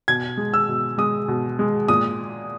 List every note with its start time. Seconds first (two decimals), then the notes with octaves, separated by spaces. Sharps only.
0.08 B2 G#6
0.37 G#3
0.54 E6
0.68 B2
0.98 G#3 D#6
1.28 B2
1.59 G#3
1.88 A#2 D#6